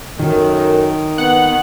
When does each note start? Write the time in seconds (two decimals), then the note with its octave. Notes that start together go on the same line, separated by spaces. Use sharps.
0.19 F#2 D#3 A4 A#4
1.18 B3 F#5